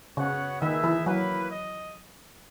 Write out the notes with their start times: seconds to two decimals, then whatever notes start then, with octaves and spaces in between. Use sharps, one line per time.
0.17 C#3 B3 F#4 C#5 F#5
0.61 D#3 D#4 G#4 B4 E5
0.84 E3
1.06 F#3 A#3 E4 B4
1.51 D#5